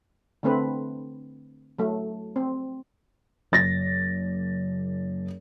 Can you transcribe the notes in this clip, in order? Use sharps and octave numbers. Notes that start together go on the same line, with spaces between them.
D3 A3 C4 B4
F#3 A3
C4
F#1 A6 A#6